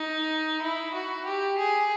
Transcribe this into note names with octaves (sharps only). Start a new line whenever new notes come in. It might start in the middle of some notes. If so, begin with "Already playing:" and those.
Already playing: D#4
E4
F#4
G4
G#4